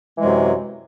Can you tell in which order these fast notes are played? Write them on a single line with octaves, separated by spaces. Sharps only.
E3 G#3 C3 F#2